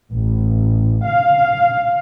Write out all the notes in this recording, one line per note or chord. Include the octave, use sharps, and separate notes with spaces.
A1
F5